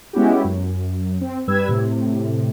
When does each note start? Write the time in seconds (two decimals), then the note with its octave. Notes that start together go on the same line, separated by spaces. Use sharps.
0.13 G#3 B3 C#4 E4 F#4 G4
0.44 F#2
1.21 C4
1.47 G2 G3 B4 E6 G#6
1.68 A2 C3